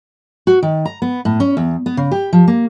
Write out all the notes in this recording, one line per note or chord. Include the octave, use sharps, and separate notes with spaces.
F#4
D#3
A#5
B3
A2
C#4
E2
B3
C#3
G4
F3
A#3